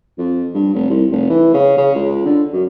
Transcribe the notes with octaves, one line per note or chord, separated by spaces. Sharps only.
F2
G2
F1
C2
F1
E3
C#3
C#3
C#2
D3
F#2